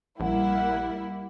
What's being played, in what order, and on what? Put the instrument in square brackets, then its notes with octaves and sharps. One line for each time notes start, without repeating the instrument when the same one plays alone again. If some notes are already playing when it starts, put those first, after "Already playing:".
[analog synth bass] A#1 [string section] G3 A#3 E4 [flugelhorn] F#5